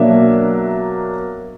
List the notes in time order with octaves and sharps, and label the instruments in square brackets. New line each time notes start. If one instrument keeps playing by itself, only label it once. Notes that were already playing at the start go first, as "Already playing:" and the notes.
Already playing: [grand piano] B2 F#3 A#3 D4 E5